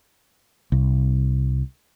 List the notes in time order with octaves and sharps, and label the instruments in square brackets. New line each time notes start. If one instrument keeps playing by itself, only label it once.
[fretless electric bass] C2